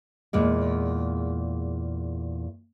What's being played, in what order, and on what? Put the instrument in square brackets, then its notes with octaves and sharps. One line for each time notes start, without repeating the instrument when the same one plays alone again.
[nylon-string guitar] E2 A#2 G#3